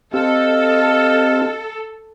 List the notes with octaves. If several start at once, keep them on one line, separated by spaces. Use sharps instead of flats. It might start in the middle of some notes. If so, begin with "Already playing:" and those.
C4 G4 A4 D#5 F5